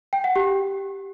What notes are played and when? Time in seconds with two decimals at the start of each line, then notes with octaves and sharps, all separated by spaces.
0.13 G5
0.24 F#5
0.36 G4